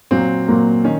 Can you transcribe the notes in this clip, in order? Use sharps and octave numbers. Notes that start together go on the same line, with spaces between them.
A#2 F#3 A#3 C4
A#2 F#3 A#3
D#3 C#4